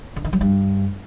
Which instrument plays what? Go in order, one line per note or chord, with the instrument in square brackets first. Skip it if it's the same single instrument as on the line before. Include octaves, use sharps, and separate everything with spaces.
[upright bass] D3
D#3
F#3
G2